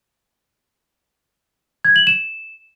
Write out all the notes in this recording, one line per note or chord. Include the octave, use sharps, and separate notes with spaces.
G#6
F#7
E7